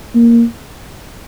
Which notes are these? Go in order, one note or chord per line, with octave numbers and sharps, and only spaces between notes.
A#3